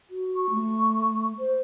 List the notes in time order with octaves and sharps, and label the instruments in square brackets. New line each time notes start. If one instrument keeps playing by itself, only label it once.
[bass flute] F#4
[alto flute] C#6
[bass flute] A3
[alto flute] C5